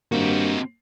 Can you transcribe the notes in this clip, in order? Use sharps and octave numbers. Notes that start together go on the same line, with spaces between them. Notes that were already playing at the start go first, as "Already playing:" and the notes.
G2 A#3 C4 F#4